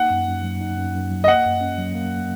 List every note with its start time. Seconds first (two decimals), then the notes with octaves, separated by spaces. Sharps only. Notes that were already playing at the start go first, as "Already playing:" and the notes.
Already playing: A#3 D#4 F#5
0.10 F#2
0.28 F#2
0.44 F#3
0.61 D#4
0.78 F#2
0.94 F#2
1.10 F#3
1.24 D#5
1.28 A#3 F#5
1.45 F#2
1.61 C#4
1.78 F#3
1.95 A#3